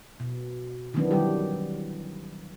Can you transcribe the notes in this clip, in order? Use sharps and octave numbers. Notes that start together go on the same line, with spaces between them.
B2
D#3 E3 F#3 B3 C4 D4
D#3 F#3 G3 G4